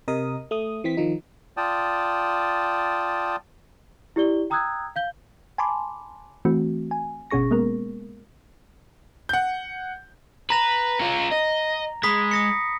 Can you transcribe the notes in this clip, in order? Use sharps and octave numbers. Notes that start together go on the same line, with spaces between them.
C3 A#4 D#5 D#6
A3 D#6
E3 C4 B6
D#3 F3 D#4
F4 D5 G5 A5 D#6
E4 G4 D5 G7
G5 A#5 D#6 E6 F#6 G#6
F5 G6 G7
G#5 A5 B5 C6 D6
E3 A3 C4 F#4
G#5
G1 B2 C#4 G#4 C#6 A#6
G#3 A#3 B3 A#4
F#5 G6
B4 A#5 A#6 F7
C#4 F4
D#5
G#3 B5 D#6 B6
D#6 A#6 C#7